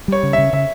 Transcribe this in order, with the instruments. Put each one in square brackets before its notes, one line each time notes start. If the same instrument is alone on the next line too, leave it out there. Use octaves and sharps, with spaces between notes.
[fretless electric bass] G3 [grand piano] C#5
[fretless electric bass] C#3
[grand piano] E5
[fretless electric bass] C#3
[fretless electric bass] C#3 [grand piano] E5